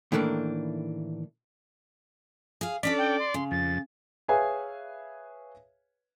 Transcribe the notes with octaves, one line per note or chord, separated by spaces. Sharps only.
A2 D#3 E3 A3 A#3 D4
G#4 F5
C#4 D4 A4 D5 B6
G5
C6
C#3
F2 A6
G#4 B4 C#5 E5 F5 G#5